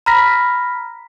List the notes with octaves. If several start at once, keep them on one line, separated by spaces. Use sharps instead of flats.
A#5 B5 F6 A#6 B6